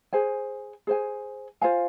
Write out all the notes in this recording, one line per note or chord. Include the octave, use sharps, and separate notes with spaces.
G#4 C5 G#5
G#4 C5 G#5
F4 C5 F5 G#5